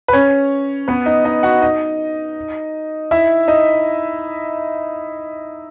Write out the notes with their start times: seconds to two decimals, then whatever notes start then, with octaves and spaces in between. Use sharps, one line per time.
0.08 B4
0.13 C#4 C#5
0.88 B3 B4
1.06 D#4 D#5
1.25 D#4 D#5
1.43 F#4 F#5
1.62 D#4 D#5
3.11 E4 E5
3.48 D#4 D#5